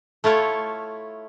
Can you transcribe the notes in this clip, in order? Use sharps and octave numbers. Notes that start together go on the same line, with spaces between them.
A3 E4 F4 C#5